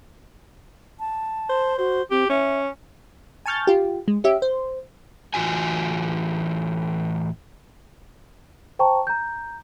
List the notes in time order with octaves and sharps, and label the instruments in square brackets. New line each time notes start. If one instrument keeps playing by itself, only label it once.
[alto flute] A5
[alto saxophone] C5
[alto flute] F#4 [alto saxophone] C5
[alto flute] C4 [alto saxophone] G4
[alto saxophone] C#4 [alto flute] E5
[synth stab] G#5 A5 C#6 F6 G6 A6
F4 G4
G#3
C#4 G4 E5
C5
[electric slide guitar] A2 E3 F4 F#4 G#5
[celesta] C5 G5 A5 A#5 C#6
A#5 G6